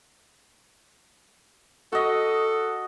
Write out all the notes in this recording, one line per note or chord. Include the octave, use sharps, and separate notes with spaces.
F#4 A4 D#5